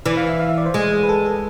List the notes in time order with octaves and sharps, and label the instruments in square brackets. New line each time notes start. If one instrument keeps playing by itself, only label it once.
[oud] E3 [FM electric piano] D5
[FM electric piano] F5
E5
F5
E5
D5
C5
[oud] G#3 [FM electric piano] G#4
[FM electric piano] B4
A4
A4